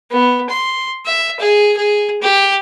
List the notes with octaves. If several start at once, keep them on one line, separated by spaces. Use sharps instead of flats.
B3
C6
E5
G#4
G#4
G4